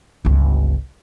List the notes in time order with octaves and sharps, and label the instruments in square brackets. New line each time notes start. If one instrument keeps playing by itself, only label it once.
[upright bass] G1 C#2